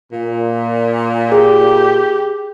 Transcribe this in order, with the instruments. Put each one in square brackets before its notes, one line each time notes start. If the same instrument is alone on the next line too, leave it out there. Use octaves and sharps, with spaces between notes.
[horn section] A#2
[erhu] G4 [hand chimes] G#4